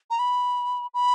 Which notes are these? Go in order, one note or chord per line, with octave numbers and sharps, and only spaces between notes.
A#5
B5
B5